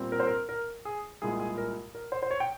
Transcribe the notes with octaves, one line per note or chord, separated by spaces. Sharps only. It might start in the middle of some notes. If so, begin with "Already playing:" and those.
Already playing: A#2 G3 C4
A#4
C5
A#4
A#4
G#4
C2 A#2 G#3 G#4
G#4
A#4
A#4
C5
C5
C#5
G5